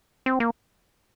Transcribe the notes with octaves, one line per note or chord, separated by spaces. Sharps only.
C4
A#3